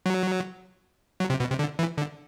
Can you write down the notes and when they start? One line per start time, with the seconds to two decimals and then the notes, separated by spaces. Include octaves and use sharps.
0.06 F#3
1.20 F#3
1.30 C3
1.40 B2
1.50 C3
1.59 D3
1.79 E3
1.98 D3